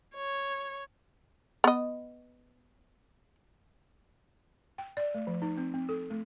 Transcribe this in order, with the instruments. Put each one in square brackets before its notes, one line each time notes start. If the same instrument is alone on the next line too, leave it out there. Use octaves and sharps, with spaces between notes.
[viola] C#5
[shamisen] B3 D#5
[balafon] G5
D5
A3
F3
D#4
C4
C4
A4
A3